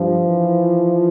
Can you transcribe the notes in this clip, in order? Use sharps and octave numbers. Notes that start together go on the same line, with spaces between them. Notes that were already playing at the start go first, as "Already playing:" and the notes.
Already playing: G2 F3
E3